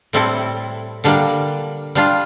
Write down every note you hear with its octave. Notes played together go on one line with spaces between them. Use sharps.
A2 G3 C4 E4 A4
D3 G3 A#3 D4
G3 D4 F4